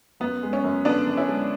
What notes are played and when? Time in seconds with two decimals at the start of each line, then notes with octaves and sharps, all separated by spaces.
0.20 F#2 B3
0.43 G#3
0.53 C#4
0.64 F#2
0.85 D3 B3 D4
1.07 F#2
1.17 C#4 E4
1.28 G#3